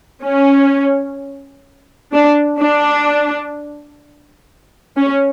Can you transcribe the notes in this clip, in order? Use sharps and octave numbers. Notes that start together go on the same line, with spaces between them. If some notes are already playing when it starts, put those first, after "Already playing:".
C#4
D4
D4
C#4